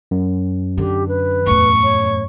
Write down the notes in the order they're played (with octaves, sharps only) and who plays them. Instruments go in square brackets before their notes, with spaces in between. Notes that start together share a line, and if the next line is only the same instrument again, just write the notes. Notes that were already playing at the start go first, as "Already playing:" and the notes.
[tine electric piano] F#2
[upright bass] D3 [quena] G4
[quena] B4
[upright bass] E2 A2 [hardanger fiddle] C#6
[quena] C#5